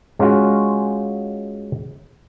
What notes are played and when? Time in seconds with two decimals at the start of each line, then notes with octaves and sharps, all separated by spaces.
0.19 G#3 C#4 F4 F#4